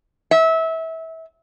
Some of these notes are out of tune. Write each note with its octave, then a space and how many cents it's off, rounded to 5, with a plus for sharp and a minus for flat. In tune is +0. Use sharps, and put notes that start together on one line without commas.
E5 -25